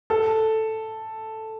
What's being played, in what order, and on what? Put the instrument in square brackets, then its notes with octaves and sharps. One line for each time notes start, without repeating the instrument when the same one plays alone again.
[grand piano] A4